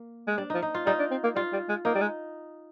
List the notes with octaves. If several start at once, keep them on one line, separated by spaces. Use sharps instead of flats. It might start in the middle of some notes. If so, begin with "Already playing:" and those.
Already playing: A#3
G#3
G3 D4
F3 D#4
D#4
F4
G3 D#4
D4
C4
A#3
G3 F4
G3
G#3
A#3 D#4
G3
G#3